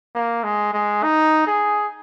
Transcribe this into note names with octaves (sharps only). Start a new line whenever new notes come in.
A#3
G#3
G#3
D#4
G#4